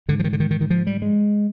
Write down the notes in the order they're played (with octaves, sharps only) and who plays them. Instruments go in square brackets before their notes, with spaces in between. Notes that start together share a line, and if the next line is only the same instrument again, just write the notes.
[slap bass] G#2 D3
F3
D#3
D3
D#3
D#3
D#3
F3
G3
G#3